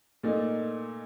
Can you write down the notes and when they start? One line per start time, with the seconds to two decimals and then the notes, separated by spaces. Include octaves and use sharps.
0.23 A#2 A3 D#4